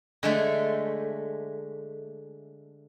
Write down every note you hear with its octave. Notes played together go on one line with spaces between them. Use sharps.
D3 G#3 A3